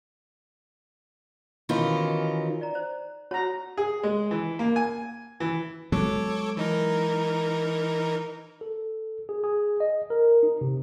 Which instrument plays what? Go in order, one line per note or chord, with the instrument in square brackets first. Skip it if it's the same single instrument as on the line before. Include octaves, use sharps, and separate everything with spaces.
[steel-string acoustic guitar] B2 D#3 E3 C#4 D#4 F4
[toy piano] D5 A#5
C5
[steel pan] F#4 A#5 [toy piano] C#5 A5
[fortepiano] G#4
G#3
E3
A#3
G#5
E3
[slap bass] F#3 G#3 B3 [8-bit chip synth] A4 C#5 D6
[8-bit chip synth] E3 D#4 A#4
[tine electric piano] A4
G#4
G#4
D#5
A#4
D#4
C3